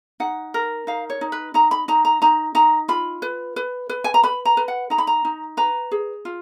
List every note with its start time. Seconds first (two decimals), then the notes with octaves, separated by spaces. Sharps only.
0.20 D#4 F#5
0.54 A#4
0.87 D#4 F5
1.10 C#5
1.21 D#4
1.32 B4
1.54 D#4 A#5
1.71 B5
1.88 D#4 A#5
2.05 A#5
2.22 D#4 A#5
2.55 D#4 A#5
2.88 F4 B5
3.22 B4
3.56 B4
3.89 B4
4.04 G#5
4.14 A#5
4.23 B4 B5
4.45 A#5
4.57 B4
4.68 F#5
4.90 D#4 A#5
4.98 B5
5.07 A#5
5.25 D#4
5.57 B4 A#5
5.91 G#4
6.25 F4